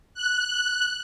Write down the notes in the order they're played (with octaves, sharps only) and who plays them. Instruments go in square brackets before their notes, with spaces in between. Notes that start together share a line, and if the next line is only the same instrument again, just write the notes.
[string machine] F#6